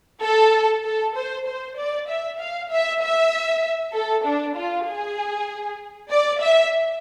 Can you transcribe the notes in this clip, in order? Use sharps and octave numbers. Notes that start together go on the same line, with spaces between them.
A4
A4
C5
C5
D5
E5
F5
E5
E5
A4
D4
F4
G#4
D5
E5